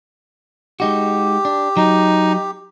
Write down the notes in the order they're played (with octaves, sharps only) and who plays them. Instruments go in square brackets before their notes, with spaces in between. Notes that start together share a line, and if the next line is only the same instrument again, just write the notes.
[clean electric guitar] G#3 D#4 F#4 [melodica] G4
[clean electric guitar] D4
[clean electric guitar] F#3 [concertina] D#4